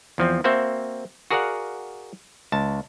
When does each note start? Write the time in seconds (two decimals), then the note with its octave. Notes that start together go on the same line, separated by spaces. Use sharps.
0.18 E2 F3 C4
0.44 A#3 C4 F#4 C5 E5
1.31 F#4 G#4 A#4 D5 F5 F#5
2.52 C#2 A5